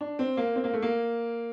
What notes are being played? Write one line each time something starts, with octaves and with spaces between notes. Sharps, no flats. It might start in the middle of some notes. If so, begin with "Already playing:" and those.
D4
C4
A#3
C4
A#3
A3
A#3